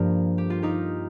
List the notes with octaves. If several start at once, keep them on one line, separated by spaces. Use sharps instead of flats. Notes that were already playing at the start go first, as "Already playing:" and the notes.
Already playing: G2 F3 A#3 G4 A#4
G4
F4
D#4 G4